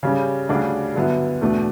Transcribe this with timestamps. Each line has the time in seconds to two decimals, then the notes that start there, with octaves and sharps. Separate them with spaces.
0.03 C#3 G3 C#4
0.49 D2 C#3 G3 D4
0.95 G2 D3 F#3 B3 E4
1.41 E2 B2 A3 D4